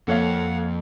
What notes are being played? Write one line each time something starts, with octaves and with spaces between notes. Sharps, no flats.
F2 F3 A#3 A4 C#5 F5 F#5